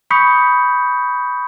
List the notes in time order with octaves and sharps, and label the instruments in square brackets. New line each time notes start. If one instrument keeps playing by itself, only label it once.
[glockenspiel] B5 C#6 D#6 G6 B6 C#7